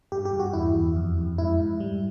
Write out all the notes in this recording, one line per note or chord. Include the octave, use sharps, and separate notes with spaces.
G2 G4
G4
G2
F#4
E2 E4
E2
F2
F2
G#2 E4
G#2
G3